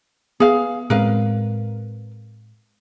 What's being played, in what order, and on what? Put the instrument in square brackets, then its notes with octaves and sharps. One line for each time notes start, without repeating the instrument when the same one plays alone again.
[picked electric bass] B3 [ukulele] G#4 F5
[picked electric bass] A2 G#3 C4 [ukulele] A#4 B4 F5